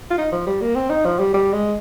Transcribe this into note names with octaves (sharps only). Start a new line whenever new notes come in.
F4
D#4
F3
G3
A#3
C4
D#4
F3
G3
G3
G#3